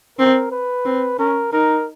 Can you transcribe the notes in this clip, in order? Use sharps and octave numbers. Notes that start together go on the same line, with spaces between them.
C4 A#4
B4
C4
C#4 A#4
D#4 A#4